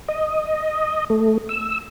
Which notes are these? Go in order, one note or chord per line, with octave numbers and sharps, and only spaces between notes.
D#5
A3
E6